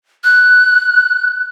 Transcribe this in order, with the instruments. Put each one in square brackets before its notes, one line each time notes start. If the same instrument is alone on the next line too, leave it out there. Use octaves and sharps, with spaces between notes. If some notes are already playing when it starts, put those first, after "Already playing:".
[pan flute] F#6